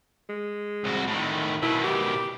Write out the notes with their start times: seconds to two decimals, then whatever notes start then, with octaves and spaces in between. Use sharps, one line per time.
0.29 G#3
0.84 C2 F#4
1.07 A2 D#3
1.62 B2 D#3 E4
1.84 G4